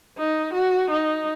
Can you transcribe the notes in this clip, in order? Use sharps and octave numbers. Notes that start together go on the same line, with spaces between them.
D#4
F#4
D#4